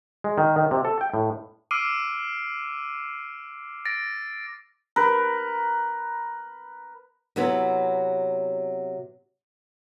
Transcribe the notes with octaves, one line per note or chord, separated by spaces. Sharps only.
G#3
D#3
D#3
C3
A4
G5
A2
D6 E6 F6 C7 D7 D#7
A6 A#6 D7
A#4 B4
C3 F#3 B3 E4